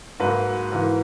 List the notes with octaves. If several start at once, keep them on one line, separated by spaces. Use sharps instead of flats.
G#2 F#3 A#3 B4
G#2 E3 A#3